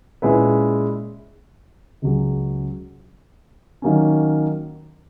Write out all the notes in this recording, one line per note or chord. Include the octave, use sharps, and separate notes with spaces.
A#2 G#3 C#4 E4 B4
C#2 C#3 F#3 C#4 G#4
D#3 F#3 A#3 C#4